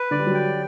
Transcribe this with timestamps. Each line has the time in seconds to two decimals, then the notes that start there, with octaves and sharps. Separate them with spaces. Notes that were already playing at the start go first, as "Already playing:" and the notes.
Already playing: B4
0.11 D3 D5
0.19 G3
0.26 F#3
0.34 G5